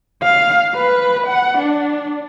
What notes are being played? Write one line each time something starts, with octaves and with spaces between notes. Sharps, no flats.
F5
B4
F#5
D4